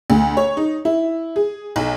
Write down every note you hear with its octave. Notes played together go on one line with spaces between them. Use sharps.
D2
C#5
D#4
E4
G#4
B1